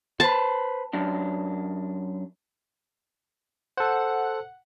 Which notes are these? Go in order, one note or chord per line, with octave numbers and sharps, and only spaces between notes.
B4 C5 A5
F#2 D4
A4 C5 F#5